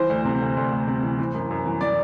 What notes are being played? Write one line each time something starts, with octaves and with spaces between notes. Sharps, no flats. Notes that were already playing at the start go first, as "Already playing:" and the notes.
Already playing: E3 C5
D2
C3
D2
D2
D2
C3
E3
E3
F#2
F#2
E3
E3 D5